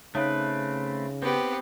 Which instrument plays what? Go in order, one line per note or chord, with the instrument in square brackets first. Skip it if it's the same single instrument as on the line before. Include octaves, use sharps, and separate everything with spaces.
[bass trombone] C#3 [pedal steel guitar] A3 C4 B4 [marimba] D#4 C#5 F5
[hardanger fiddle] B3 G4 [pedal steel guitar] C4